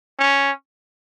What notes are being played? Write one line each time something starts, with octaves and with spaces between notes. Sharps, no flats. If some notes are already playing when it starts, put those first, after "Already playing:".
C#4